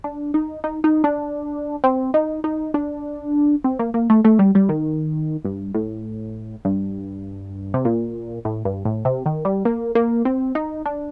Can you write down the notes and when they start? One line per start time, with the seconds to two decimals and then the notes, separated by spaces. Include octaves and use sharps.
0.04 D4
0.34 D#4
0.64 D#4
0.84 D#4
1.04 D4
1.84 C4
2.14 D#4
2.44 D#4
2.74 D4
3.64 C4
3.79 A#3
3.94 A#3
4.10 A3
4.25 A3
4.39 G3
4.55 G3
4.69 D#3
5.45 G2
5.75 A2
6.65 G2
7.74 C3
7.85 A#2
8.45 A2
8.65 G2
8.85 A2
9.05 C3
9.26 D#3
9.45 G3
9.65 A#3
9.95 A#3
10.25 C4
10.55 D#4
10.86 D4